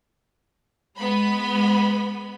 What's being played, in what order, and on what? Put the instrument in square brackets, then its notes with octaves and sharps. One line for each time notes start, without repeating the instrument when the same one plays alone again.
[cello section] G#3 [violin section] B3 B5